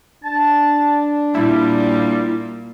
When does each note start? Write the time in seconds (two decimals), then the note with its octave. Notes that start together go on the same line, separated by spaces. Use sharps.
0.24 D4 A5
1.35 A#2 G3 E4